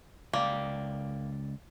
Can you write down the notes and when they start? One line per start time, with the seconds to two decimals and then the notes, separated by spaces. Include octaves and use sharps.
0.33 C#2 A#3 D5 G5